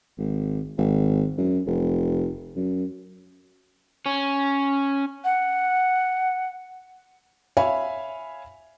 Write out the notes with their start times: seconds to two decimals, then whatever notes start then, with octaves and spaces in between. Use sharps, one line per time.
0.18 G#1
0.78 G#1
1.38 F#2
1.66 F1
2.56 F#2
4.06 C#4
5.24 F#5
7.57 C#5 E5 F5 G#5 B5